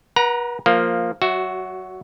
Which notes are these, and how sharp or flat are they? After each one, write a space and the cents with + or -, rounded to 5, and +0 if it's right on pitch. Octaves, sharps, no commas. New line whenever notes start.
B4 -40 F#5 +0 A#5 +10
F3 +0 A#3 -10
F#3 +25 F#4 +0 E5 +0